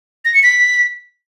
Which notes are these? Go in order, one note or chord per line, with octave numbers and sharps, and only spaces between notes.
A#6
C#7
B6